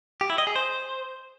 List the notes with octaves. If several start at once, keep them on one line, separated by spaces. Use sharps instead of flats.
G4
E4
D#5
G#4
C5